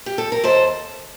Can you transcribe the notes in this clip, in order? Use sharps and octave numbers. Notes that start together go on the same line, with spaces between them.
G4
A4
A#4
D#2 A4 C5